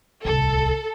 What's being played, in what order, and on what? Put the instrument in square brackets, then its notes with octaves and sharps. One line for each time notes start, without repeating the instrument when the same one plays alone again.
[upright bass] D1 C2 [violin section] A4